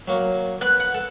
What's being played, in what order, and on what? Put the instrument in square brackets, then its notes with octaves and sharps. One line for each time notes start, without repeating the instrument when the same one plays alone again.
[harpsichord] F#3 A#3
[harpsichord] B3 [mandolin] F#6
[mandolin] F#5
[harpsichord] A4